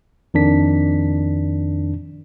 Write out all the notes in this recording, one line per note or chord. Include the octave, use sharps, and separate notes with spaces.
F2 D#3 D4 B6